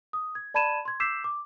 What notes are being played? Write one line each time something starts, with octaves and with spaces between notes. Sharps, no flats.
D#6
G#6
D5 A5 B5 G#6 D#7 E7
C6 G#6
D6 E6 G6 B6 C7 E7
D6